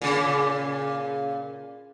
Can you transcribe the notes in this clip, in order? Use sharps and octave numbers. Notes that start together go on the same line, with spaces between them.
A#2 C#3